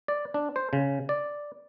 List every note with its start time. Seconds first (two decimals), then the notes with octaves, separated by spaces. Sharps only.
0.08 D5
0.34 D4
0.56 C5
0.73 C#3
1.09 D5